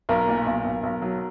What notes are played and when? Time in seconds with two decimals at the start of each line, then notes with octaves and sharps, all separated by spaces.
0.09 B1 A#4
0.28 A#2
0.46 B1
0.65 B1
0.83 B1
1.02 F#3